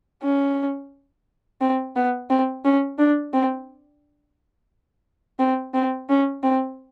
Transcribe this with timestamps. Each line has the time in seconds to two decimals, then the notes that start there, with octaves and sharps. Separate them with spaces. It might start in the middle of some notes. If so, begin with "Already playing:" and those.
0.24 C#4
1.61 C4
1.96 B3
2.30 C4
2.65 C#4
2.99 D4
3.33 C4
5.39 C4
5.74 C4
6.09 C#4
6.43 C4